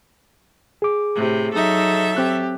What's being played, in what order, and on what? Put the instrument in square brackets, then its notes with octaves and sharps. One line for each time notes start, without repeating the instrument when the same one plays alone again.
[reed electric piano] G#4 D6
[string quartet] A2 C3
[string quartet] F#3 A4 E5 [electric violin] D#4
[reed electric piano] C4 F#6 [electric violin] G4